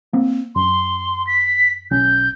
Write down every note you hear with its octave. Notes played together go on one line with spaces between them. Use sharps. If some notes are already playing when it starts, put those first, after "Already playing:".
A#3 C4
F#2 C6
B6
B1 C#4 G6